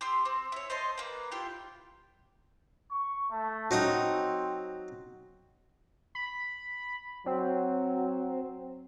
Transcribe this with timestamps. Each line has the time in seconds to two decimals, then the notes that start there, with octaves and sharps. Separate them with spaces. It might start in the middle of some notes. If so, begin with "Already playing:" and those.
0.01 G4 C6 E6
0.25 C4
0.52 E4 C#5
0.70 C5 D#5 A5 C6
0.98 A#3 B4
1.31 E4 F4 G4 G5
2.91 C#6
3.31 A3
3.71 F#3 C4 D#4 D#6
6.15 B5
7.26 F#3 C4